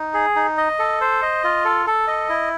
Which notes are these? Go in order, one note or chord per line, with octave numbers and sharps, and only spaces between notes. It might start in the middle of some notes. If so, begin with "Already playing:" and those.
Already playing: D#4
G#4
D#4
D#5
A4
C5
D#5
F4
A4
A4
D#5
E4